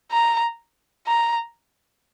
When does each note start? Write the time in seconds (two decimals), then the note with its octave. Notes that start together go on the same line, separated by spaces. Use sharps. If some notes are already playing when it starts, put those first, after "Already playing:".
0.12 A#5
1.06 A#5